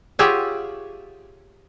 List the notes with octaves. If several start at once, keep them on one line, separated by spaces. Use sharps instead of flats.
F4 G4 G#4 C#5 E5 F#5